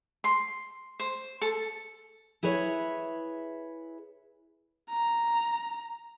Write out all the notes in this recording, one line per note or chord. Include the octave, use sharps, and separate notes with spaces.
C6
C5
A4
E4 G#4 B4 C#5 E5
A#5